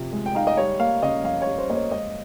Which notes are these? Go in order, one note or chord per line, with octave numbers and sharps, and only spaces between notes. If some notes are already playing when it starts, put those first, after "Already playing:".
Already playing: C3 F3
G#3
G5
D#4 F5
D#5
G3 C#5
A#3 F5
C#3 D#5
F2 F5
C#5
G3
C5
A#3 D#5
C#5
G#3 D#5